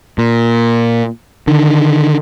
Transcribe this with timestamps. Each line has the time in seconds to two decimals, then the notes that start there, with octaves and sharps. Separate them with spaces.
0.18 A#2
1.47 D3 D#3